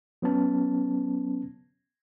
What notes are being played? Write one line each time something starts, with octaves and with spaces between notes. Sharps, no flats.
F#3 B3 C#4 A5